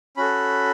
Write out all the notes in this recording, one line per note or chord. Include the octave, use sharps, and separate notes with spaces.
C#4 F#4 A4 B5